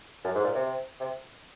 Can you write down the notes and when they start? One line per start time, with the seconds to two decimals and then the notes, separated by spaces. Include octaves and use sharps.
0.24 F#2
0.35 G#2
0.44 A#2
0.55 C3
1.00 C3